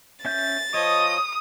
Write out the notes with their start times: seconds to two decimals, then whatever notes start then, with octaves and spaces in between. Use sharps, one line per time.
0.25 C#4 E5 G6 A6
0.74 F3 C#5 D#5 D#6